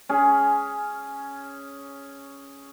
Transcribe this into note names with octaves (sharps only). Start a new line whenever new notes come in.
C#4 G#4